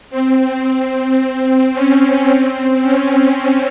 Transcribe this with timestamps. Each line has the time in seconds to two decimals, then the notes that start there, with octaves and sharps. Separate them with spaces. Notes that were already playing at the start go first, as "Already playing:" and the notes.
0.10 C4
1.74 C#4
2.28 C4
2.82 C#4